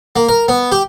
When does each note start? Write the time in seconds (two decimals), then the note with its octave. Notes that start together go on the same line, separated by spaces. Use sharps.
0.16 A#3
0.29 A#4
0.48 B3
0.72 G4